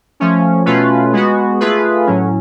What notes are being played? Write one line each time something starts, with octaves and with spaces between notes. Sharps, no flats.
F3 A3 C#4
B2 A3 C#4 F4 B4
G#3 B3 F#4
A3 F4 G#4 B4
A2 F#3 C#4